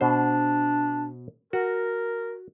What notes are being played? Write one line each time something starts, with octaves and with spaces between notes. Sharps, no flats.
B2 D4 C5
F#4 A#4